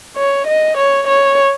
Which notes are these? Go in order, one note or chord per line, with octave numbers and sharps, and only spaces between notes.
C#5
D#5
C#5
C#5